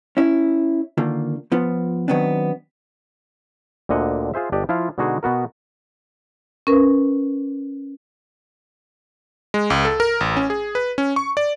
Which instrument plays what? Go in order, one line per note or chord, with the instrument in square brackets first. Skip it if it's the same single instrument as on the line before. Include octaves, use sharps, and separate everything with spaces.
[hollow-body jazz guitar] C#4 E4
D3 D#3 A#3 F4
F3 B3 F4
D#3 F#3 B3 C4 D4
[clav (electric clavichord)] D2 A#2 D3 D#5 F#5
F4 G#4 C5 E5
G1 D4 G4 D5 D#5
F3 E4 F4 F5
B2 D3 G#3 D#4 F#4 G#4
B2 B3 F#4 A#4
[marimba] C#4 A#4 B4
[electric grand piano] G#3
C#2
A4
A#4
A1
C#4
G#4
B4
C#4
C#6
D5